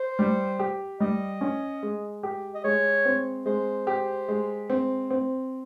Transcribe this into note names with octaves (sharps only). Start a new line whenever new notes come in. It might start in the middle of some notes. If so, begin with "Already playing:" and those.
Already playing: C5
G3
G4
G3 D#5
C#4
G#3
G4
D#5
G#3 C#5
C4
G#3 C5
G4
G#3
C4
C4